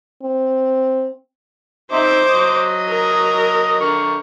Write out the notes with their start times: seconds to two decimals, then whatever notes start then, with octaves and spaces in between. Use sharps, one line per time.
0.23 C4
1.92 C4 D#4 C5 E5 D6
2.29 F#3 D#5 D#6
2.90 A#4
3.80 D3 A#4 C#6